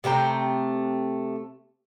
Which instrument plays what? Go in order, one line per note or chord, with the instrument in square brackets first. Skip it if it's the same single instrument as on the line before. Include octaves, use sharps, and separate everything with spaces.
[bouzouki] C3 A3 G5 A#5